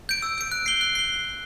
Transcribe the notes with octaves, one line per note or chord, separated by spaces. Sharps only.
G6 D7
E6
G6 D7
F#6
C7 G7
F#6
C7 G7